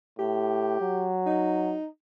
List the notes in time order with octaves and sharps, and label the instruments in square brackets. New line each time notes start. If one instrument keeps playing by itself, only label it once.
[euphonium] A2 [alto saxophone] G4
[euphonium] F#3
[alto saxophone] D#4